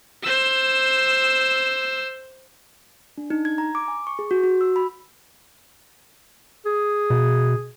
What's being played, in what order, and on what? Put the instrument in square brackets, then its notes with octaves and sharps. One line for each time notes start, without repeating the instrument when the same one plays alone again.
[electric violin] C5 E6
[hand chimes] D4
D#4
G#6
A#5
D6
G#5
C#6
G#4
F#4
F#4
E6
B5
[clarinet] G#4
[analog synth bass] B2